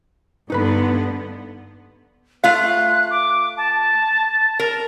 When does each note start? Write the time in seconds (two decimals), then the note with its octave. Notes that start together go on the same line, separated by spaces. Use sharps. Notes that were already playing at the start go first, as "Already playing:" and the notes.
0.50 G2 D3 B3 D#4 B4 B5
2.44 A3 F4 F5 F#6
3.11 D6
3.57 A5
4.59 A#4